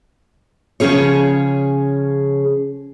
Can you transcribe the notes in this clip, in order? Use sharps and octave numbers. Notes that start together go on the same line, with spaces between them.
C#3 F3 F#3 C#4 G#4 C#5